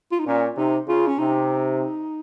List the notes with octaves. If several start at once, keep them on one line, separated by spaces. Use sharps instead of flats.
F4
D#4
A#2 C#4
C3 D#4
C#3 F4
C#4
C3 D#4